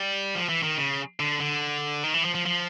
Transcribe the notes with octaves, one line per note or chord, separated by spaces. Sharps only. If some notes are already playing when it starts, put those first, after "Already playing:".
Already playing: G3
F3
E3
D#3
C#3
D3
D3
D#3
E3
F3
F3
F3